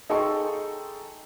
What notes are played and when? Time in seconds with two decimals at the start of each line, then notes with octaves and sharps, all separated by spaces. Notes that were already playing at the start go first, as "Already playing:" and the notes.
0.10 D#4 G#4 A4 G5 C6 C#6